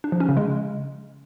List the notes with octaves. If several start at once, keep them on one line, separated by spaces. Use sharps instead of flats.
D4
F3
C#4
C#3
G#3